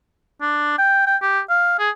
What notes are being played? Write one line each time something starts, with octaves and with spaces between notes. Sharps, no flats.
D4
G5
G5
G4
F5
G#4